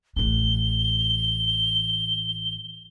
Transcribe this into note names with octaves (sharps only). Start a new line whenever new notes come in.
A1 E3 G7